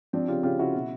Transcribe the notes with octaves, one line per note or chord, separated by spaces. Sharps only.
F3 C4 D4
C#3 F4 G4
C#3 F4 G4
C#3 E4 F#4
B2